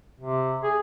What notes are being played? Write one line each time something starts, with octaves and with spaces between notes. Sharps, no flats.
C3
G#4